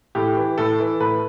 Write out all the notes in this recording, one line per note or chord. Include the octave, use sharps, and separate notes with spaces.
A2 G4
E3
A2 A4
E3
A2 B4